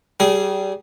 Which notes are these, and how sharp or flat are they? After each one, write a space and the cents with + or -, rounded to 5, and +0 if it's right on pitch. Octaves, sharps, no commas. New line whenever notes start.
G3 -25 G#4 +0